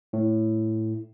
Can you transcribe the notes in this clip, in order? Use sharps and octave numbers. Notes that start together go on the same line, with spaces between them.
A2